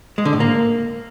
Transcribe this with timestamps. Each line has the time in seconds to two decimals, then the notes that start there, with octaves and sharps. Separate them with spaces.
0.18 G#3
0.25 D3
0.33 A2
0.40 A#3